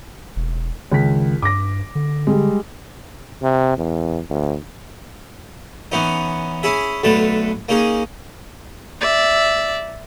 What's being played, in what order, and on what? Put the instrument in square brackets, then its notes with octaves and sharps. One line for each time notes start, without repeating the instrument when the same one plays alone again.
[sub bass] E1
[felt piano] C#2 B6 [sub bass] D#3
[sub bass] G2 [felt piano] D6 A#6
[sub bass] D3
[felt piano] G3 G#3
[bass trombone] C3
E2
D2
[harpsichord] E3 B3 C#4 D#4
C#4 E4 G#4 E5
B1 D3 A3 B4 A5
A#3 C#4 D#4 G#4
[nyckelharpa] D5 E5